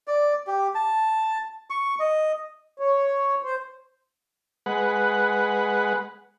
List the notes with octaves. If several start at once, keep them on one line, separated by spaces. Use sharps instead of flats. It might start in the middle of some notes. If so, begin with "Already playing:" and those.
D5
G4
A5
C#6
D#5
C#5
C5
G#3 B4 F#5